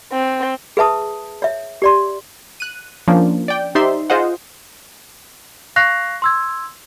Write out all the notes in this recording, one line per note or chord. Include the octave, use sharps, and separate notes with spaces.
C4
G#4 B4 E5 A5 D#6
C#5 E5
G4 D5 C6
F#6 D#7
F3 A#3 C#4 D4
D5 G5
D#4 G4 C5 D5 E5 C6
F4 G#4 C5 D#5 F#5
F5 C#6 F#6 A#6 C7 F7
C6 E6 G#6